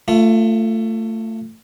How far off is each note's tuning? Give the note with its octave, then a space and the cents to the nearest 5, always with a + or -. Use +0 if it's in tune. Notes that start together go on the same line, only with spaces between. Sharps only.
A3 +20 F4 -10